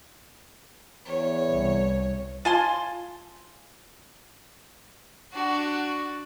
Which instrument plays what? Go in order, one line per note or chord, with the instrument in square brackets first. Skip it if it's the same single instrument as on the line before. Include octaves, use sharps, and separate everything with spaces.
[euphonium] E2 [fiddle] C#5
[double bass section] C2
[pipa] F4 G#5 A5 C6
[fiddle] D4 F#4